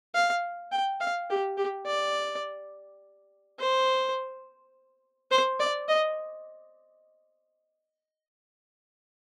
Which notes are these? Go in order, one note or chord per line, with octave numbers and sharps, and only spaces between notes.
F5
G5
F5
G4
G4
D5
C5
C5
D5
D#5